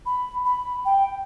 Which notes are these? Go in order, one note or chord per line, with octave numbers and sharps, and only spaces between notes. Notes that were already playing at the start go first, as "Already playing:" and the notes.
B5
B5
G5